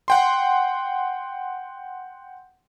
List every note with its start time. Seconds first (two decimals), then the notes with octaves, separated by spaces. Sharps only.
0.08 F#5 G5 C6